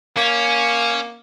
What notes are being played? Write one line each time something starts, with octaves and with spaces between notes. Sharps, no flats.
A#3 C#4